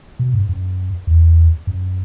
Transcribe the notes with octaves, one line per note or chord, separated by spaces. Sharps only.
B2
G2
F#2
E2
F#2